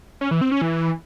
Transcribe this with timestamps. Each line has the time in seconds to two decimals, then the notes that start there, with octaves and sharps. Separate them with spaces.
0.21 C#4
0.31 E3
0.41 C4
0.51 C#4
0.62 E3